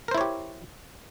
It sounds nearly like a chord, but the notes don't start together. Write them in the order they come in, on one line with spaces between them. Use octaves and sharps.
A#4 C5 E4 C#5 G4